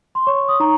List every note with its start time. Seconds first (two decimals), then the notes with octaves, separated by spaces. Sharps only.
0.15 C6
0.27 C#5 C#6
0.48 D#6
0.60 D#4 A#5